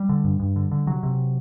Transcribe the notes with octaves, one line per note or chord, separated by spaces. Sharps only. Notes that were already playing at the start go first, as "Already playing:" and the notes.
Already playing: G3
D3
G2
G2
D3
D3
C3 F#3
C3